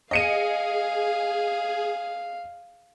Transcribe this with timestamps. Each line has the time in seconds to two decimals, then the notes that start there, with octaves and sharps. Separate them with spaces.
0.11 G#4 D#5 F5 C#7 D#7